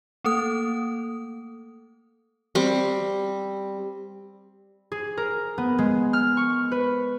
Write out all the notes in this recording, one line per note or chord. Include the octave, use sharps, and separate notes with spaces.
A3 A#3 A4 D#6
G3 C4
G#4
A#4
B3
G#3
F6
C#6
B4